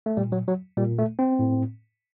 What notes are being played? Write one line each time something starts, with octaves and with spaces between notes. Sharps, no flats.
A3
A#2 G3
F#3
F#3
A#2 G3
A3
C4
A2